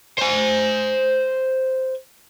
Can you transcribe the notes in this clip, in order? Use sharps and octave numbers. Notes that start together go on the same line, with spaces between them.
C5 G#5